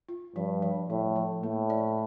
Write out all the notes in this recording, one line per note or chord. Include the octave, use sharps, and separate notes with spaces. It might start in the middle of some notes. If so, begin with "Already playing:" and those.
F4
G2 F3
F3
A2 F3
F3
A2 A#3
D5